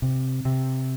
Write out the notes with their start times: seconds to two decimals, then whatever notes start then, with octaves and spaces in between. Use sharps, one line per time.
0.02 C3
0.45 C3